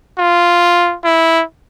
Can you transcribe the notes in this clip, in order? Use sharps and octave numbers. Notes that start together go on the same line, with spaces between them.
F4
E4